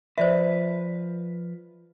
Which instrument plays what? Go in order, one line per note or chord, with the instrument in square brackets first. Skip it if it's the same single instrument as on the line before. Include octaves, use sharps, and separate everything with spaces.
[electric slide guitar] F3 B4 [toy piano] C5 D5 E5